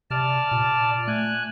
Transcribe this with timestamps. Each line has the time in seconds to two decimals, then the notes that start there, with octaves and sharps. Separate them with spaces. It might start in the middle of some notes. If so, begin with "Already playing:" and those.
0.11 C3 D5 A5 F6
0.51 A#2
1.07 A3 G#5 F#6